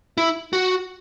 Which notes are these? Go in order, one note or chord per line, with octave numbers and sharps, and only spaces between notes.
E4
F#4